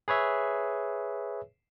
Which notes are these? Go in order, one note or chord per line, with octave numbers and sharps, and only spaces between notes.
G#4 B4 C#5 E5